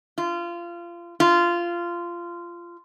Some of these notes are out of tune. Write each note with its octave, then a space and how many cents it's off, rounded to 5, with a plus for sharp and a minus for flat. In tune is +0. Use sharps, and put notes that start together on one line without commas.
F4 -25
F4 -15